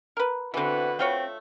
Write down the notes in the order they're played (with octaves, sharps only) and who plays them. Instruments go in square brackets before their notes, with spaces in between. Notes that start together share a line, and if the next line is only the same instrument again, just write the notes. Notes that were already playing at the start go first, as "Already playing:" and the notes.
[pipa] A#4 B4
[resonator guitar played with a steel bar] D3 B3 [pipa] E3 C4 [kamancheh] F#4 B4
[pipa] A3 F4 C#5 [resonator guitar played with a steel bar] C4